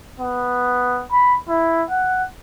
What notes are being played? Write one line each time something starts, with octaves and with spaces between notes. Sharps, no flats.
B3
B5
E4
F#5